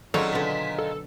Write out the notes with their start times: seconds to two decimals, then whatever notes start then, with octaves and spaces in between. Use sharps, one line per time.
0.14 A#2 D#3 F#3 G#3 C4 C#4 A4
0.33 B2 D3 B6
0.78 A4